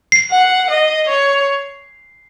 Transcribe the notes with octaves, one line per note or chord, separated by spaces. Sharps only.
C7
F#5
D#5
C#5